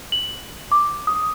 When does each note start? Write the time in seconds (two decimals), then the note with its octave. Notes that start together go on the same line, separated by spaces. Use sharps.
0.12 F#7
0.72 D6
1.07 D#6